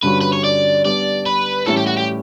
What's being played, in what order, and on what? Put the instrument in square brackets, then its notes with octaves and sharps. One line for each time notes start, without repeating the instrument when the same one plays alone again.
[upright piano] G2 D3 G3 C#4 F#4 [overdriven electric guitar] B4
[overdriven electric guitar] B4
C#5
D5
[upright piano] G3 B3 D4 [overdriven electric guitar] D5
[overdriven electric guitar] B4
[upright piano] A2 E3 G3 C#4 E4 [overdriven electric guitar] A4
[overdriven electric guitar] G4
F#4
G4